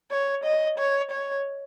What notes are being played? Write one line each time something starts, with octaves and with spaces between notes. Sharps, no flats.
C#5
D#5
C#5
C#5